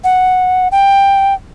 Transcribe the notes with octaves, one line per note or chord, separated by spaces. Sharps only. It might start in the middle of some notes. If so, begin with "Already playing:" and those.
F#5
G5